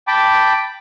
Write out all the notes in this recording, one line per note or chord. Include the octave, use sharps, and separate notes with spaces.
G5 A5 B5 D6